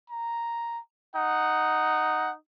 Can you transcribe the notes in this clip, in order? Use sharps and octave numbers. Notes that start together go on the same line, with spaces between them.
A#5
D#4 F#5